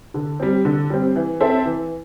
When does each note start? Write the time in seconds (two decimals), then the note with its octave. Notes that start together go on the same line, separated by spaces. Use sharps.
0.14 D3
0.40 G3 C4
0.65 D3
0.90 G3 C4
1.16 E3
1.40 C4 A4 C5 E5
1.65 E3